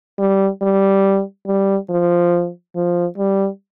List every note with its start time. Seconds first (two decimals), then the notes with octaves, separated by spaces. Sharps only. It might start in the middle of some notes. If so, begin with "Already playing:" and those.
0.19 G3
0.62 G3
1.47 G3
1.90 F3
2.76 F3
3.18 G3